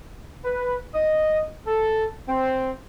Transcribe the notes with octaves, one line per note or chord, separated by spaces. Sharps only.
B4
D#5
A4
C4